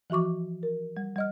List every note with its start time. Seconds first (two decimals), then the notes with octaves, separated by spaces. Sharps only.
0.10 E3 F3 F#4 C#6 D6
0.63 A#4
0.97 G3
1.16 G3 D#5 F6